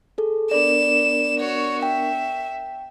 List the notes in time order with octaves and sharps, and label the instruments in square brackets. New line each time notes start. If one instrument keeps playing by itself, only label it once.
[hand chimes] G#4 A4
[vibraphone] B3 D4 A#4 [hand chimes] D5 [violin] E7
[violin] F#4 C#5
[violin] E5 [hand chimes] G5